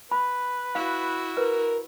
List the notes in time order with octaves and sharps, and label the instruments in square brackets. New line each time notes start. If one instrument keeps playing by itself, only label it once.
[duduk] B4 [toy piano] B5
[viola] E4 F#4 [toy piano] F5
[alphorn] A#4 [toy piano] B4